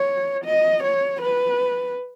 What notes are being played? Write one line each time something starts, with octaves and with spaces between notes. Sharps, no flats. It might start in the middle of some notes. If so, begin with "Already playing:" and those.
Already playing: C#5
D#5
C#5
B4